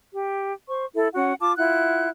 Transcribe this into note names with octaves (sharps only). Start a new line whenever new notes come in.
G4
C5 C#6
E4 A4
C#4 F#4 F#5
F4 A5 D6
E4 F4 F#5 F#6